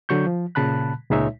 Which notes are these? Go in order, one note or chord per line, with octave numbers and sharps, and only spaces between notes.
D3 F#3 C#6 G6
F3
A#2 C#3 A5 B5 F#6
C#2 A#2 G#3 D#4 C#5 E5